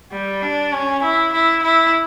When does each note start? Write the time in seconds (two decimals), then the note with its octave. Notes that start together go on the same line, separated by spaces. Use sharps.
0.12 G3
0.42 D4
0.73 C#4
1.03 E4
1.33 E4
1.63 E4